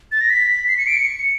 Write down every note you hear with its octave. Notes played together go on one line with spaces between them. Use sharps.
A6
A#6
B6
C7
C#7
D7
C#7